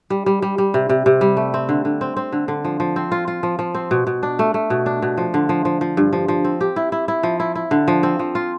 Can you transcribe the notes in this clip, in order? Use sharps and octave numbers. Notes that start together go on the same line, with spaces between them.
G3
G3
G3
G3
C3
C3
C3
G3
A3
C4
D3
D3
C4
C4
D3
D3
F3
F3
C4
F4
F4
F3
F3
C4
B2
B2
D4
A3
A3
B2
D4
B2
F3
D3
F3
F3
F3
G2
F3
F3
C4
G4
E4
E4
E4
F3
E4
E4
D3
F3
C4
F3
F4